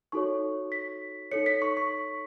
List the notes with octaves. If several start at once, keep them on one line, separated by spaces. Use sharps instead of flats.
D#4 F#4 A4 C#5 C#6
B6
D#4 A4 C#5 C#7
B6
C#6
C#6